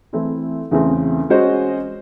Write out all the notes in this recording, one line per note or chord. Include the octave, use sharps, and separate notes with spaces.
E3 A3 C4 E4
E2 C#3 E3 A3 C4
G#3 C#4 F#4 C5 D#5